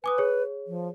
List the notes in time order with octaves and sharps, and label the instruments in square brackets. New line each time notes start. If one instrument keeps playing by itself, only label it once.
[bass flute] B4 [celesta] G#5 D6 D#6
[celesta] G#4 C#5
[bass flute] F3